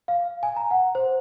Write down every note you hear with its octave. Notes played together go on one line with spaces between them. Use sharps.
F5
G#5
A#5
F#5
C5